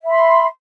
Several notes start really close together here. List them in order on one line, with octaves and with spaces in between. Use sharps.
E5 B5 C6